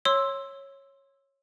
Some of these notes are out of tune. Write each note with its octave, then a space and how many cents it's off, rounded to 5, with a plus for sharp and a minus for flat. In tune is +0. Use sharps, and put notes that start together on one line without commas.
C#5 -15 C6 +10 E6 +0